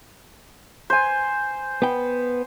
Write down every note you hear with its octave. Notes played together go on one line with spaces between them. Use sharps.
C5 G#5
B3 G5